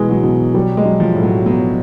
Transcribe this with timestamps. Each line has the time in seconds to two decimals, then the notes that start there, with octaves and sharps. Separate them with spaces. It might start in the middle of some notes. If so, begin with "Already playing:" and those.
Already playing: B2 E3 G#3
0.09 F#3
0.24 B2
0.54 F#3 G3
0.77 G#3
0.85 F#3
1.00 F3
1.15 A2
1.23 F#3
1.46 F#3 B3